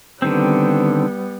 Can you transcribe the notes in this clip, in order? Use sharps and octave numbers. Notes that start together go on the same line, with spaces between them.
D3 D#3 G3 B3 C4